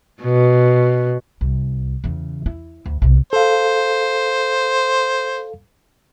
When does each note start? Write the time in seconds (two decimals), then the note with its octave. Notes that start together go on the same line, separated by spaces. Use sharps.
0.22 B2
1.41 C2
2.04 E2 C#3
2.46 E4
2.86 D2
3.02 B1 C3
3.33 A4 C5 F5